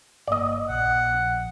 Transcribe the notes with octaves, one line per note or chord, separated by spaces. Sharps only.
G1 A#3 D5 D#5
A#1 F#5